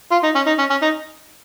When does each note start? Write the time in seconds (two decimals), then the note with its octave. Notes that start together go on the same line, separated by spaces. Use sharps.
0.12 F4
0.23 D#4
0.35 C#4
0.47 D#4
0.59 C#4
0.70 C#4
0.82 D#4